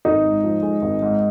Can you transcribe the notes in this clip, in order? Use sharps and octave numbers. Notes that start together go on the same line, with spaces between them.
G#1 D#4
G#2
F3
G#3
G#1
G#2